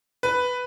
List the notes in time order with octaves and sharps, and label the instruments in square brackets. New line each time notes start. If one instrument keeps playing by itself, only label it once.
[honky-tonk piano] B4